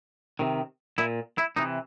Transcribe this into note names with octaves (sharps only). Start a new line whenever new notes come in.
C3 D#3
A#2 E4
E4
C3 E3 D#4